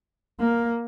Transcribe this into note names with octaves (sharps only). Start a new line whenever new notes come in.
A#3